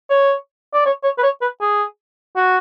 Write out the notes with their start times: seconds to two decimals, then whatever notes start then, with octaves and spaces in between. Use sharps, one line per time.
0.10 C#5
0.74 D5
0.86 C#5
1.04 C#5
1.18 B4
1.23 C#5
1.42 B4
1.61 G#4
2.36 F#4